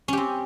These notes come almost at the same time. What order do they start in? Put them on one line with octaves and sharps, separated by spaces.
C#4 G4 C4